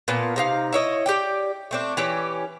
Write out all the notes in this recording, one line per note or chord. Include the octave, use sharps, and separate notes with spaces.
A#2 B3 F4 A5
C3 D#4 F5
E4 C#5 D#5
G4 D5 G5
A3 C4 D4
E3 C#4 G4